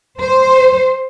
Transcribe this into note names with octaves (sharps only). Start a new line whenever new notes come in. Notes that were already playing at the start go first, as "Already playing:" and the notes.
C5